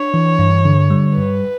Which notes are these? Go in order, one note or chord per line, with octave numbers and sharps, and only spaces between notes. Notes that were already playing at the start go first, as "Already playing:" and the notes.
Already playing: D4 C#5
E3
G2
D3
G3
G2 B4